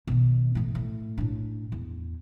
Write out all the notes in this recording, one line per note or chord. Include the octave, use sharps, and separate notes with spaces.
B2 D#3
A2 E3
A2
A2 D4
E2